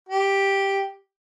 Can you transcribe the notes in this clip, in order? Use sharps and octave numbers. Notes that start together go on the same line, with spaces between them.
G4